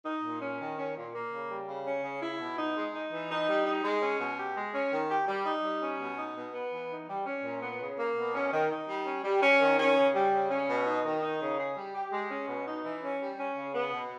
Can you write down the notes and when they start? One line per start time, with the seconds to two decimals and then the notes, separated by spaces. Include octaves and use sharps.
0.05 D#4
0.23 A#2
0.42 C#4
0.60 D#3
0.78 C#4
0.96 A#2
1.14 A#3
1.32 C#3
1.50 G3
1.68 C#3
1.86 C#4
2.04 C#3
2.22 E4
2.40 B2
2.58 D#4
2.77 G#3
2.94 D#4
3.12 E3
3.31 D#4
3.49 G3
3.66 D#4
3.84 G#3
4.02 C#4
4.20 B2
4.38 G4
4.57 G#3
4.74 C#4
4.93 D#3
5.10 G4
5.28 G3
5.46 D#4
5.64 G3
5.82 C#4
6.00 B2
6.18 D#4
6.36 B2
6.54 B3
6.72 E3
6.90 D#4
7.09 G3
7.26 C#4
7.44 A#2
7.62 B3
7.81 C#3
7.99 A#3
8.16 B2
8.34 C#4
8.53 D#3
8.70 D#4
8.89 G3
9.06 C#4
9.24 G3
9.42 C#4
9.60 D#3
9.78 C#4
9.96 C#3
10.14 G3
10.33 C#3
10.51 C#4
10.69 B2
10.86 D#4
11.05 D#3
11.23 D#4
11.41 C#3
11.58 G#4
11.77 G3
11.94 G4
12.12 G#3
12.31 C#4
12.48 B2
12.66 D#4
12.84 E3
13.03 C#4
13.21 G3
13.38 C#4
13.57 C#3
13.75 B3
13.93 B2